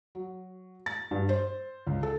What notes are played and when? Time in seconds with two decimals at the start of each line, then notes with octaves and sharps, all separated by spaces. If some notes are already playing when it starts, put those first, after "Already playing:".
0.15 F#3
0.86 A6
1.11 G2
1.29 C5
1.87 C#2
2.03 A4